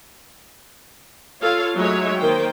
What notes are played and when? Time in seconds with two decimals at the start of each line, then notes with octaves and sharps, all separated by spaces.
1.41 F4 A4 C#5 F5
1.75 F#3 G#3 A3 D#4 C#5 E5
2.17 D#3 A#3 C5 G5